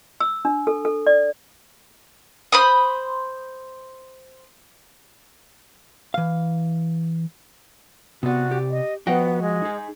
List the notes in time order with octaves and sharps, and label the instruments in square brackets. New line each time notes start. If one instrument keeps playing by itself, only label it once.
[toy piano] E6
D4
A4
A4
D5
[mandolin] C5 B5 D#6
[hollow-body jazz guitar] E3 F5
[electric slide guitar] C3 D5 [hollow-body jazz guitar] B3 [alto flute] F#4
[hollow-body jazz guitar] G4
[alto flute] D#5
[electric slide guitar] F3 F#4 [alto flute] B3 [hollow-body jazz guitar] D#5 F#5 G5
[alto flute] G#3
[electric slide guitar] D#4 G#4